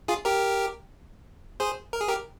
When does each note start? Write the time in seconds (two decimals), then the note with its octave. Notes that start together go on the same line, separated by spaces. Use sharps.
0.08 F4 G#4
0.25 G4 A#4
1.60 G#4 C5
1.93 A#4
2.01 G#4
2.08 G4 A#4